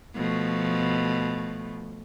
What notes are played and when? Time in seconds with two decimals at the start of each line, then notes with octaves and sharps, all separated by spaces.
0.15 B2 F3 A3